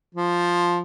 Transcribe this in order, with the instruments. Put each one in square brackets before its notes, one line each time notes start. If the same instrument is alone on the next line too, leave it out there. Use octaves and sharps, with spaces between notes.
[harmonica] F3